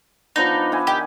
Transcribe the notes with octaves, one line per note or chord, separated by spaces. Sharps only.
F3 B3 D4 D#4
B3 E5 G#5
D#3 G4